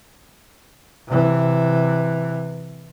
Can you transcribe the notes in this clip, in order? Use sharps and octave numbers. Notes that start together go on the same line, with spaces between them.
C3 E3